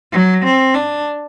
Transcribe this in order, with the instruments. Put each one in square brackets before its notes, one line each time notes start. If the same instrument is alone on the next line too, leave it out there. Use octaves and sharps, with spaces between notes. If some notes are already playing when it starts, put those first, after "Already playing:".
[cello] F#3
C4
D4